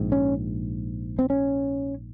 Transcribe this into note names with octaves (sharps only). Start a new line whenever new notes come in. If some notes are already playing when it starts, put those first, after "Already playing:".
Already playing: A#1 G#2
C#4
C4
C#4